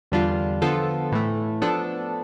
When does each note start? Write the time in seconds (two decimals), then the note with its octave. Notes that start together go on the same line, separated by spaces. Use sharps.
0.12 E2 D3 G3 D4 F4
0.62 D3 F3 B3 F4 A4
1.12 A2 E3 A3
1.61 F3 B3 D4 A4